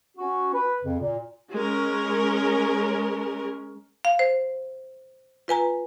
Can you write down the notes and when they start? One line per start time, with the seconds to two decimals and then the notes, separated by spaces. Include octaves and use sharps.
0.18 C#4 F#4
0.53 B4
0.83 F2 C#3
1.00 A#2
1.51 G#3 C#4 A#4
4.05 F5
4.19 C5
5.48 F4 B4 G#5 A#5